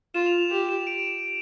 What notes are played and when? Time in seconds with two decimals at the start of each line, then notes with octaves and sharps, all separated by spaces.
0.14 F4 E7
0.26 F7
0.38 F7
0.51 G4 F7
0.69 E7
0.87 D7